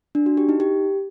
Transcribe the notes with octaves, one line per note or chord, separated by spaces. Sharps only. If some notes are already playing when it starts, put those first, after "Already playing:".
D4
F#4
G4
D#4
G4